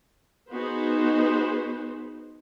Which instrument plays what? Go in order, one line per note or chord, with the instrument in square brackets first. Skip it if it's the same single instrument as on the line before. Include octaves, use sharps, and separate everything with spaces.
[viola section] B3 D#4 F#4 G#4 B4 C5